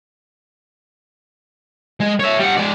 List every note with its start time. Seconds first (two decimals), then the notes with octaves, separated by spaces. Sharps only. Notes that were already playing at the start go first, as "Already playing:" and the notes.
2.01 G#3
2.20 C#5 E5
2.39 G3 F#5
2.57 G#3 D5